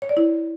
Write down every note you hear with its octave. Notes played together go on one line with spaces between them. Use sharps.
C#5
D5
E4